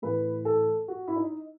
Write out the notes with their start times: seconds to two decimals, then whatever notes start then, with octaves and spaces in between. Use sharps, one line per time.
0.02 A2 E3 B4
0.45 A4
0.88 F#4
1.08 E4
1.16 D#4